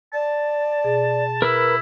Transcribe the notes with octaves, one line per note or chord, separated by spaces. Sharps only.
D5 A5
B2 G#4
E4 A#4 B4 E6